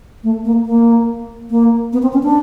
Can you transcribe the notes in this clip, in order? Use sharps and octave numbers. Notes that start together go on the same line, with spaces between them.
A3
A#3
A#3
A#3
B3
C4
C#4
D4